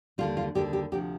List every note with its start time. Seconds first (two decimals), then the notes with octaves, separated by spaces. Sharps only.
0.18 D#2 D3 G3 F4
0.37 F4
0.55 D#2 D3 G3 G4
0.73 G4
0.92 D2 C3 F3 G4